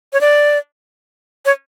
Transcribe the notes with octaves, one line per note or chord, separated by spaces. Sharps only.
C#5
D5
C#5